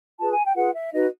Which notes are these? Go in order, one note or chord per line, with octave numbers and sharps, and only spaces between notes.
F4 G#4 B4 A5
G#5
G5
F4 G#4 B4 F#5
E5
D#4 F#4 B4 D#5